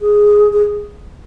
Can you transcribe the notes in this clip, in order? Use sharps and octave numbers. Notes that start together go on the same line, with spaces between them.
G#4
G#4